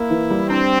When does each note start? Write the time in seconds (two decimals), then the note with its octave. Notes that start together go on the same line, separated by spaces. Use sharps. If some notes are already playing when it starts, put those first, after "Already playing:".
Already playing: A#3 E4
0.10 E3
0.30 G3
0.49 C4 D4